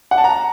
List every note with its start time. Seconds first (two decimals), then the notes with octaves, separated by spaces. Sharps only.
0.11 F#5
0.18 A5
0.24 A#5